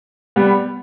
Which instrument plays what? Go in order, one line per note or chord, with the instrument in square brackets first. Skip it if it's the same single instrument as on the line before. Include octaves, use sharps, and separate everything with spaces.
[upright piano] G3 B3